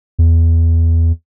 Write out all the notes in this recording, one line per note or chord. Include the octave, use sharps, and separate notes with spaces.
E2